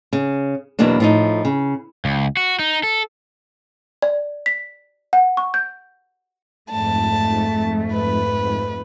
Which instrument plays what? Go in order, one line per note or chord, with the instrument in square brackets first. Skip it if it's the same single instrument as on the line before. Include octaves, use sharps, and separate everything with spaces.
[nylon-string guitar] C#3
E2 B2 F#3 A#3 D4
A2 F3 D#4
C#3
[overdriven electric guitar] C#2
F#4
D#4
A4
[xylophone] D5
B6
F#5
C#6
G6
[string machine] F2 G#2 [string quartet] A3 [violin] A5
[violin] B4